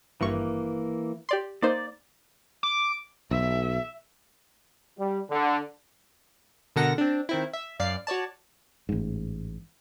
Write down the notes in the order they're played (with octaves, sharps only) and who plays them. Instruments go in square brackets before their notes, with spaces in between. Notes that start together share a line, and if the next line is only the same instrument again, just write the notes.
[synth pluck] G#1 G2 C#6 [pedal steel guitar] E3 A#3
[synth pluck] G4 D5 C6
[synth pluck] A#3 D#4 C5 [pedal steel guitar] D5
[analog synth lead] D6
[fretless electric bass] B1 [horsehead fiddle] E5
[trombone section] G3
D3
[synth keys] B2 D3 A4 A#4 F#5 A#6
C4 D4
D#3 C4 E4
E5
F#2 D5 F5 C7
F#4 C#5 D5 A5
[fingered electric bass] A1 G#2